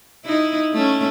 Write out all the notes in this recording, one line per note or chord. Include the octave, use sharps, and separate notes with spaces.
D#4 E4
A3 C#4